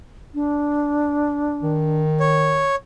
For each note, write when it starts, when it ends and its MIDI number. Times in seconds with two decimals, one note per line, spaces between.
0.34 2.03 62
1.63 2.68 51
2.20 2.75 73